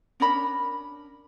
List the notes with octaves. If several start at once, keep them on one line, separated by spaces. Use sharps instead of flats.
C#4 D4 A#4 B5